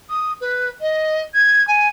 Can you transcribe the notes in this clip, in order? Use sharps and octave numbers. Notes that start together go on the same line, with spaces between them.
D#6
B4
D#5
G#6
G#5